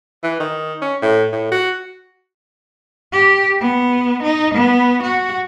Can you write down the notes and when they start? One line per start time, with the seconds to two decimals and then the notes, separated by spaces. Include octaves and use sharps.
0.24 E3
0.40 D#3
0.82 C#4
1.02 A2
1.33 A2
1.51 F#4
3.12 G4
3.61 B3
4.23 D#4
4.55 B3
5.03 F#4